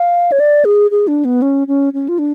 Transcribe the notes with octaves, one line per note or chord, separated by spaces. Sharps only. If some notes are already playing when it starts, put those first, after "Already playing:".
Already playing: F5
C#5
D5
G#4
G#4
D4
B3
C#4
C#4
C#4
F4
D4